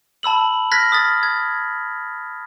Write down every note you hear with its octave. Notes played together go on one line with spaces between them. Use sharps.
A5 B5 E6 F#7
F6 F#6 G#6 A#6 B6
D#6 F6 A6
G#6